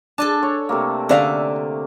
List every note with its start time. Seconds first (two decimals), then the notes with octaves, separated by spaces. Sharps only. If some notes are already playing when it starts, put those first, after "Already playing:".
0.18 D4 A4 G#5 A5
0.43 C#5
0.69 C3 A3 A#3
1.09 D3 C#4 D5 E5 F5 A#5